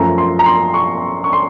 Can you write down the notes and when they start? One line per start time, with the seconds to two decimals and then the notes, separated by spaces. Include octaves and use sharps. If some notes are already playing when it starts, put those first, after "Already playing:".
Already playing: F#2 F3 A3 A#5
0.18 C6
0.39 A#5
0.46 C6
0.74 C#6
1.24 C#6
1.33 C6